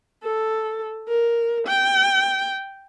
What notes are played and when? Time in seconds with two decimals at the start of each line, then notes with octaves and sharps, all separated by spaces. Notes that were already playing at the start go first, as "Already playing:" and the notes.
0.24 A4
1.08 A#4
1.67 G5